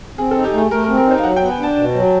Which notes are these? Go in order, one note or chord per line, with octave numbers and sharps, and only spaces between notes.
C4 G#4
A4
D#4
G4
A3 G#4
A3 A#4
A#4
C4
A#4
D#4 C5
F5
F#3 F#5
G5
B3
G#5
D4 A5
B2
F#3